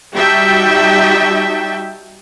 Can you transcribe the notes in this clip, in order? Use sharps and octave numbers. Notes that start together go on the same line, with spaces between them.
G3 D#4 F#4 E5 G5 A5